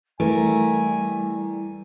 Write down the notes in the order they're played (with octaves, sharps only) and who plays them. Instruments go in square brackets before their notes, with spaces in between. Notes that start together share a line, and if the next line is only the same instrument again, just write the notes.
[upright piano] E3 [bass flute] G3 [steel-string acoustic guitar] A3 A#4 [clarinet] G#5